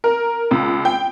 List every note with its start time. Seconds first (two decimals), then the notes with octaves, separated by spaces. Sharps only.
0.04 A#4
0.51 C#2
0.85 G5